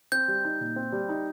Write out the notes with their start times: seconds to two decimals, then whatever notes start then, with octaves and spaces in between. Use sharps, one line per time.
0.12 C4 G6
0.28 G3
0.45 D#4
0.60 A#2
0.76 C4
0.92 G3
1.09 D#4